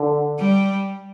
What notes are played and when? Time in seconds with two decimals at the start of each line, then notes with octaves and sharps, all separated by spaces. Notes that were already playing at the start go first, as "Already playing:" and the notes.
Already playing: D3
0.39 G3